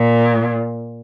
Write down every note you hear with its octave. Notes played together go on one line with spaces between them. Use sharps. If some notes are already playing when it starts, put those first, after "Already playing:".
Already playing: A#2